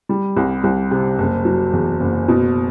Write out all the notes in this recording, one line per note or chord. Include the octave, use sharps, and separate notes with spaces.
G3
C2
C2
C3
F#1
F#3
E2
F#1
B2